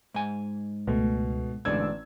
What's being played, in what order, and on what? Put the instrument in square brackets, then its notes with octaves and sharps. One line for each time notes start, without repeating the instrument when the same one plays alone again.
[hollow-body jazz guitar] G#2 G#5
[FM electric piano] C#2 A3 [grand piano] B2
[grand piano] A1 D5 G#6 [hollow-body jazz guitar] G#2 B2 D3 [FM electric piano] E6